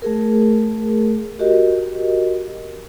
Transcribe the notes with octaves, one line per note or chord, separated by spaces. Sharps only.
A3 G#4 A#4
F#4 G4 A#4 D#5